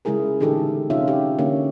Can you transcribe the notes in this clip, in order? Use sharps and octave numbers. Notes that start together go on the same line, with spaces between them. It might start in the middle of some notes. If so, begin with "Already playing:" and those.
C#3 G#3 E4 G#4 A#4
A#2 D3 E3 D#4 G4 A4
C3 C#4 D#4 F4 E5
G4
D3 A#3 C#4